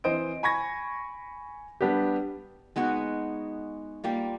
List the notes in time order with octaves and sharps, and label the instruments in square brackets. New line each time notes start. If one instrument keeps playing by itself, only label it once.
[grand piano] E3 C4 C5 D#5 D7
G#5 B5 C#6 G#6 A#6
G3 B3 D4 G4
[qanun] G#3 B3 D#4 F#4
G3 A#3 F4